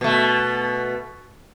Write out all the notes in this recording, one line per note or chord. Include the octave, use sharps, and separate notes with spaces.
B2 A3